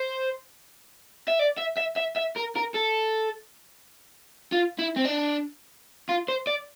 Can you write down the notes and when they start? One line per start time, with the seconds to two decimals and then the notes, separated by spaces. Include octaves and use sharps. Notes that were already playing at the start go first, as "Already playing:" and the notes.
Already playing: C5
1.28 E5
1.39 D5
1.58 E5
1.78 E5
1.97 E5
2.17 E5
2.37 A#4
2.56 A#4
2.75 A4
4.52 F4
4.79 E4
4.96 C4
5.05 D4
6.09 F4
6.28 C5
6.47 D5